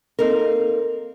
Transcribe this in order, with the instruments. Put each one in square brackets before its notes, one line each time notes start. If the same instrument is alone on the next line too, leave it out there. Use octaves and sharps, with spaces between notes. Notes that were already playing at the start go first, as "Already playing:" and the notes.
[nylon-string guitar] A#3 C4 D#4 A4 A#4